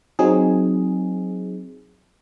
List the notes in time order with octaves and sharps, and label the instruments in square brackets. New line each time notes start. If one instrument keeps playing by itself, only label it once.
[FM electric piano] F#3 C4 D#4 G#4